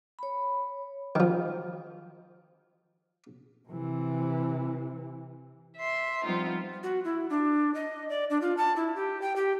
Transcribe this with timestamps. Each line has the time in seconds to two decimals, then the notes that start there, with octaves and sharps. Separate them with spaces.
0.19 C#5 B5
1.15 D#3 F3
3.68 C3 E3
5.77 E5 C6
6.24 F3 G3 B3 C4 D#4 F4
6.83 F#4
7.04 E4
7.30 D4
7.75 D#5
8.09 D5
8.30 D4
8.42 F4
8.57 A5
8.76 E4
8.96 G4
9.22 G5
9.36 G4